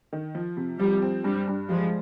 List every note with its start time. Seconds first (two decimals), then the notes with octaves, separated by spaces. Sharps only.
0.13 D#3
0.35 F3
0.57 C3
0.79 F3 G3
1.02 C4
1.24 G2 G3
1.48 G2
1.69 F3 G3 G#3